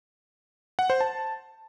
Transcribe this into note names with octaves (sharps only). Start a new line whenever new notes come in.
F#5
C5
A5